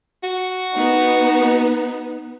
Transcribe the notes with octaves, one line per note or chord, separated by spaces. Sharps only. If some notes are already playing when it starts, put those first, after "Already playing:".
F#4
B3 D#4